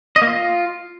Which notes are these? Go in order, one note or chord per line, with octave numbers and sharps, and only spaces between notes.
D#5
A#3
F4